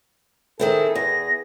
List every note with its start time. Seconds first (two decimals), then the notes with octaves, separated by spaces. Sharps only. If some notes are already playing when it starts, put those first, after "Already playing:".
0.59 D#3 C4 E4 G#4 A4
0.95 E2 A#6